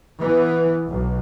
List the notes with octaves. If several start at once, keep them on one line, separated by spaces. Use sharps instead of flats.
E3 B3
B1